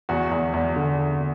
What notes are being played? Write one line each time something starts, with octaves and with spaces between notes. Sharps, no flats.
E2 F#4
E2
E2
D3
D3